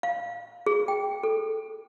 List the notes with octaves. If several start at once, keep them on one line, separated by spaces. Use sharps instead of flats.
F5
G#4
G5
A4